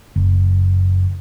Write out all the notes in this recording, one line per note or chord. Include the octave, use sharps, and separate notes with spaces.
F#1